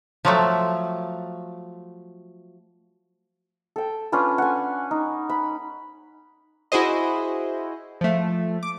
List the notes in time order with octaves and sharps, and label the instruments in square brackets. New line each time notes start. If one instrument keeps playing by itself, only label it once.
[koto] F3 F#3 A3
[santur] A4 G5
C#4 D4 F4 B4
F#5 G#5
D#4
B5
[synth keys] E4 F#4 G#4 C5 D#5
F3 A3
D6